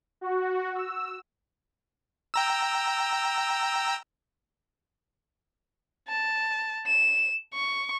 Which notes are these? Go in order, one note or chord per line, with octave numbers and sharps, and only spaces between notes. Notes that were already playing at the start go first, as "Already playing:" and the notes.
F#4
E6
G5 A#5 E6
A5
E7
C#6